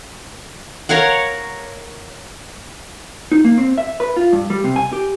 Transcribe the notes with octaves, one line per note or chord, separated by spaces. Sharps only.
A#4 C#5 F5 F#5
D#4
A#3
C4
E5
B4
F4
G2
G3
C3
G#5
G4